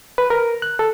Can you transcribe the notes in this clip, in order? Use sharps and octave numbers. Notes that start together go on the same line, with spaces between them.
B4
A#4
F#6
A4